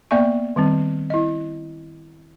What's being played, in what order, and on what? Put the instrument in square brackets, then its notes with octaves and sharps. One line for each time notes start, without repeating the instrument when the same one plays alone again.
[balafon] A#3 B3 D5 E5 G#5 C#6
D#3 G3 C4
E4 D#5